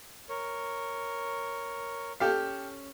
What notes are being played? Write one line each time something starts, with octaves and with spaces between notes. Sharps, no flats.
A#4 C#5
C#4 G4 A4 F5